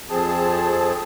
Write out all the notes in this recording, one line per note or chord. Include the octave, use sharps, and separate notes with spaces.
F2 F3 C4 G#4 A5